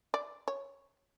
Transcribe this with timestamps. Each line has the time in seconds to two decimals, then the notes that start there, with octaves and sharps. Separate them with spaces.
0.14 D5
0.48 C#5